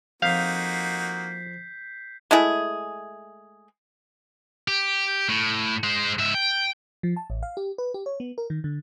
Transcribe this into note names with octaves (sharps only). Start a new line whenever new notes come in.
F2 A#3 D#4 F#4 F5 G6 B6 C7
G#3 A3 E4 G#4
G4
A2
G#3 C5
G#2 E5
G5
F3
A5
A1
F5
G4
B4
G4
C#5
B3
A#4
D#3
D3